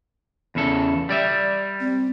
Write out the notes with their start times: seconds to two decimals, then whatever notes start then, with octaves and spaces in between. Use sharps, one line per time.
0.55 E2 C#3 A4
1.09 G3 D5 E5
1.80 C4